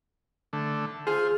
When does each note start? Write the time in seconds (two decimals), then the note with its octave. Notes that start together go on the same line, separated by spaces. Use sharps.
0.53 D3 A3
1.07 F4 G#4 C5